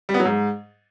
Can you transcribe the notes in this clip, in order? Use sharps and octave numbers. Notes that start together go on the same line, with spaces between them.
G3
B3
F#3
G#2